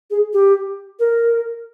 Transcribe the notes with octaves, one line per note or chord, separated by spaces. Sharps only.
G#4
G4
A#4